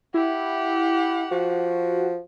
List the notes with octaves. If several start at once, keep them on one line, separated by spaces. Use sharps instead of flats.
E4 G4 F#5
F3 F#4